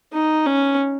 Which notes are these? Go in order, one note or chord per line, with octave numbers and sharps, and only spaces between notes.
D#4
C#4